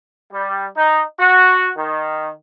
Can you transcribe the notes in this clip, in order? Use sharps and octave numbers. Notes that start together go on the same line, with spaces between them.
G3
D#4
F#4
D#3